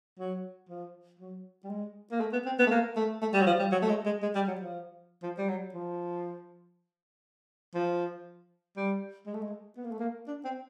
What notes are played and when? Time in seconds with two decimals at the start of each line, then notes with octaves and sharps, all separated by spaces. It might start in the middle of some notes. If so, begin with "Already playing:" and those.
0.19 F#3
0.69 F3
1.20 F#3
1.64 G3
1.70 G#3
2.12 A#3
2.20 A3
2.33 B3
2.46 C4
2.59 B3
2.67 A3
2.71 A#3
2.96 A3
3.22 A3
3.34 G3
3.41 F#3
3.46 F3
3.59 G3
3.72 F#3
3.82 A3
3.89 G#3
4.06 G#3
4.22 G#3
4.35 G3
4.48 F#3
4.61 F3
5.23 F3
5.38 G3
5.48 F#3
5.74 F3
7.75 F3
8.76 G3
9.26 G#3
9.34 A3
9.41 G#3
9.77 B3
9.84 A#3
9.91 A3
9.99 A#3
10.28 D4
10.44 C4